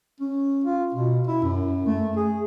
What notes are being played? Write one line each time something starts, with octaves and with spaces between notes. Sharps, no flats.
C#4
F4
B2
E4
F#2
A3
G#4